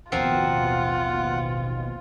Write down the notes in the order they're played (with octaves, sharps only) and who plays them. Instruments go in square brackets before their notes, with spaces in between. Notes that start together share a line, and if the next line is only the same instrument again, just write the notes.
[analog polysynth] A1 D#2 B2 [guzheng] F3 C4 A#4 [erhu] F4 [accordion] F#5